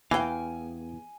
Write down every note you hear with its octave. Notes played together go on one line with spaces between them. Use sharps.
E2 E3 F5 G5 G#5